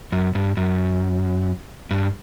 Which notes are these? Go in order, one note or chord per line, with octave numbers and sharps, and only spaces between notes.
F#2
G2
F#2
G2